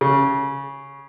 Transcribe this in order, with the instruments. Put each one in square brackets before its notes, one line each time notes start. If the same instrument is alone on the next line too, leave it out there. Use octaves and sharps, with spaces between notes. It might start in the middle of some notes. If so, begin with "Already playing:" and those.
[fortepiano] C#3